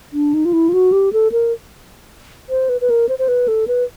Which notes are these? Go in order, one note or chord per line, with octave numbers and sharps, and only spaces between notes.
D4
D#4
F4
E4
F4
F#4
G4
A4
A#4
C5
B4
B4
A#4
C5
C5
B4
A4
B4